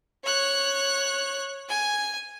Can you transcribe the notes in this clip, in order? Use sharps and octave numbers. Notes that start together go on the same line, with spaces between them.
C#5 F#6
G#5